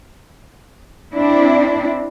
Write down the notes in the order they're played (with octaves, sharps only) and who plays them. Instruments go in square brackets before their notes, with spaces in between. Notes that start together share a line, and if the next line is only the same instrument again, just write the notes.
[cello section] C4 D4 E4